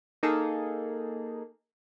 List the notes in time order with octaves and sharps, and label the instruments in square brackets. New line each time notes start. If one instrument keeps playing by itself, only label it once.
[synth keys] A#3 D#4 G#4 A4